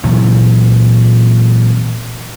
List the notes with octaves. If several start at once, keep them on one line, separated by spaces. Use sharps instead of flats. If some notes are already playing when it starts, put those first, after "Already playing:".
A#2 E3 F#3 C4